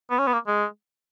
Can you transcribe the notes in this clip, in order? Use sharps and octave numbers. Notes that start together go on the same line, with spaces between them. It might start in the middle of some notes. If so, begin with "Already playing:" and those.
B3
C#4
B3
A#3
G#3